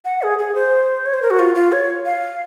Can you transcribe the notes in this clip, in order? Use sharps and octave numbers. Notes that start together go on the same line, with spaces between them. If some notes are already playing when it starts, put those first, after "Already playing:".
F#5
G#4
G#4
C5
C#5
C5
A#4
F#4
F4
F4
C#5
F5